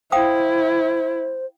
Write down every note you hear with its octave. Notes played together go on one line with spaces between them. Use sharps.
E4 C5 F5 G5 D#6